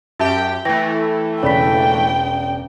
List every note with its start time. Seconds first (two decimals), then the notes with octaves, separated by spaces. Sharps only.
0.19 F#2 G4 E5 G5 A5
0.65 E3 A3 G5 A#6
1.43 E1 C#3 C#5 D5 G5 B5 B6